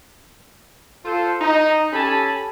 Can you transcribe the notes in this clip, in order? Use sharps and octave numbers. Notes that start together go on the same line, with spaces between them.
F4 A4 C5
D#4
C#4 G4 A4 G#5 A5 B5